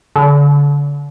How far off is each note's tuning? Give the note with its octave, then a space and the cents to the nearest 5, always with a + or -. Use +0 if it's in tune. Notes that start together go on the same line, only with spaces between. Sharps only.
D3 -35